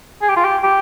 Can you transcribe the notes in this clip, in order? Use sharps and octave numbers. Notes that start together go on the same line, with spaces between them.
G#4
G4
F4
G4
G4